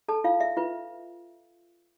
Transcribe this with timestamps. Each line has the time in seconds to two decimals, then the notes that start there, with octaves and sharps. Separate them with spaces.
0.08 A4 A5
0.24 F4 F5
0.40 E5
0.57 F4 B4